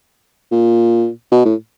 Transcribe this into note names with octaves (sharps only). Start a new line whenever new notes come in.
A#2
B2
A2